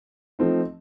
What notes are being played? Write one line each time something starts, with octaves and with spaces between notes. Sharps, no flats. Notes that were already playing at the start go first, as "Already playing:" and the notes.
F3 A3 C4 D#4